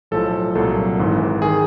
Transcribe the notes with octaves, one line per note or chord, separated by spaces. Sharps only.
B1 A2 F3 A4
C2 A#2 F#3 A4
G#1 G#2 E3
D#3 G#4